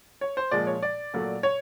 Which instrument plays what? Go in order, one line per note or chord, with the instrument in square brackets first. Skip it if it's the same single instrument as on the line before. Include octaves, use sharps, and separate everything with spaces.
[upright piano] C#5
C5
A#2 F3 G#3 D5
C#5
D5
A#2 F#3 A3
C#5